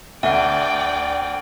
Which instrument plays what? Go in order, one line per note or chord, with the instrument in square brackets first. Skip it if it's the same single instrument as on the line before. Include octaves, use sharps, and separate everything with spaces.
[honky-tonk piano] D2 [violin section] D5 G5 [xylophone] E5 F#5